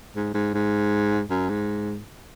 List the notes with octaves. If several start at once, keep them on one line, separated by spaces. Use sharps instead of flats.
G#2
G#2
G#2
F#2
G#2